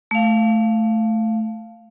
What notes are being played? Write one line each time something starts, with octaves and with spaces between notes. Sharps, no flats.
A3 F5